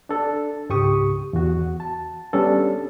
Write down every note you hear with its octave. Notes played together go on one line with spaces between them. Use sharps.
D4 A4
C#2 G#2 G4 C#6 D#6
E2 F#4
A5
G3 B3 C#4 D4 A4